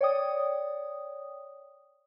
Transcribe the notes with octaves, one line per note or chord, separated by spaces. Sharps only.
C#5 D5 G5 D#6